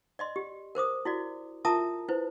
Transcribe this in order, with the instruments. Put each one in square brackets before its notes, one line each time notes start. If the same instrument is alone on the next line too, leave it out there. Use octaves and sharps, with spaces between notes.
[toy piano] D5 D#5 C6
G4
A#4 C5 D6 D#6
E4 F#4 D5
F4 A#4 E5 A5 A#5 D#6
E4 B4 C5